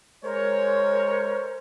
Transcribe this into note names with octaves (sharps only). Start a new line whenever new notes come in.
G#3 A#4 C5 C#5